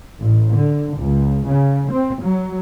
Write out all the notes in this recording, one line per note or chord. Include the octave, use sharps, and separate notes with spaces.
A1
D3
C#2
C#3
C4
F#3